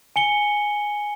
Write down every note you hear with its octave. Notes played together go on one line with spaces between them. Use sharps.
G#5 C#7 G7